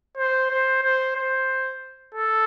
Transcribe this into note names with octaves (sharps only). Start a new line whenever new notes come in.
C5
C5
C5
C5
A4